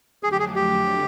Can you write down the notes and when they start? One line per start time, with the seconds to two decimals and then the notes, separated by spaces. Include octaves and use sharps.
0.23 F2 D3 F#3 A3 D4 G#4
0.32 G4
0.39 G#4
0.55 G4